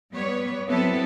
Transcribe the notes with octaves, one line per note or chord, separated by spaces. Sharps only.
G3 B3 C#5
F#3 B3 C4 E4 A4